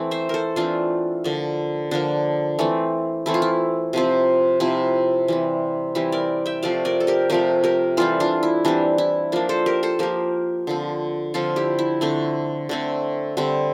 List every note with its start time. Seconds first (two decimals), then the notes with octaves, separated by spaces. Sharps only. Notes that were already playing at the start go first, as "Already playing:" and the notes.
Already playing: E3 A3 C4
0.11 C5 E5
0.29 A4 A#4 C5
0.56 E3 A3 C4 D4 F4
1.24 D3 F3 A#3
1.91 D3 F3 A#3 D4
2.59 E3 A3 C4
3.26 E3 A3 C4 E4
3.34 F4
3.42 E4
3.93 C3 F3 C4
4.60 C3 F3 C4 E4
5.28 E3 G3 C4
5.95 E3 G3 C4 E4 G4
6.12 A#4 D5
6.46 E5 G5
6.63 C3 F3 A3 D5 F5
6.85 A#4 D5
7.00 A4
7.07 G4 A#4
7.30 C3 F3 A3 G4 A#4
7.64 G4 A#4
7.97 E3 G3 C4 F4 A4
8.20 D4 F4
8.43 E4
8.65 E3 G3 C4 D4
8.98 E4
9.32 F3 A#3 D4
9.49 A4 C5
9.66 G4 A#4
9.83 A4 C5
9.99 F3 A#3 G4 A#4
10.67 D3 F3 C4
11.34 D3 F3 C4 F4 A4
11.56 E4 G4
11.79 E4
12.01 D3 A3 C4 D4
12.69 D3 A3 C4
13.37 D3 G3 C4